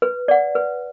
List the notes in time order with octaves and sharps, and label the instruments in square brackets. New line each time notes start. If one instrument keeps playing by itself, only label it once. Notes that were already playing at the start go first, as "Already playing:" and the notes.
[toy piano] B4
D5 F#5
B4